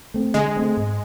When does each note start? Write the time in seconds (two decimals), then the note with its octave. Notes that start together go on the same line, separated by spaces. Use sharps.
0.14 A3 C4
0.34 D3 G#3
0.57 A3 C4
0.77 G#2